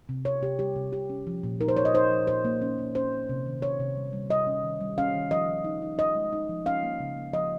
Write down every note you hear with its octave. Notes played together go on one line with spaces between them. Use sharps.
C3
C3 C#5
C3 G4
G3 G4
C3
C3 G4
C#4
F3
A#2
D#4 A#4
C5
D#4 C#5
D#5
D#4 C5
F3
A#2 C5
A#3
C#4
A#3
C#4 C5
C#4
C3
D#3
C#4 C#5
C3
G3
G3
G3 D#5
C#4
D#3
G3
C#4 F5
D#3
F3 D#5
F3
D#4
D#4
D#4 D#5
G#3
D#4
F3
C#4 F5
A#3
C#3
A#3
F3 D#5